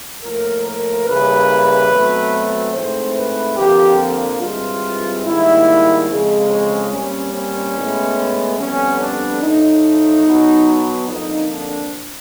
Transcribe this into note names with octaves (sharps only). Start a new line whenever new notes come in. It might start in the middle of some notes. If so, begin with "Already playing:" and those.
A2 F3 A#3 A#4
A#4
C#3 E3 G3 A#3 B4
B2 F#3 A3 C4
G#2 E3 A3 C4 C5
B4
F2 D3 F3 A#3 G4
G2 E3 G#3 C4 F4
G#2 D#3 G3 A#3 E4
F2 C#3 F3 G#3
C#4
A#2 G3 C4 C#4
C#4
A2 E3 G#3 B3
F2 D3 G3 B3 C#4
D4
A2 F3 A3 D#4
B2 F#3 B3
F2 D3 F3 A#3 D#4
D4